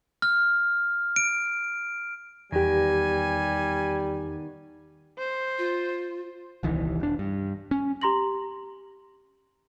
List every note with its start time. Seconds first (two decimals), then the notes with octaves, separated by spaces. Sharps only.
0.22 F6
1.16 D7
2.52 E2 D#3 G3 B3 G4 G#5
5.19 C5
5.58 F4
6.63 D#1 C2 D#3 E3
7.00 E1 D4
7.19 G2
7.71 C#4
8.01 G4 A#5 C6 A#6 F#7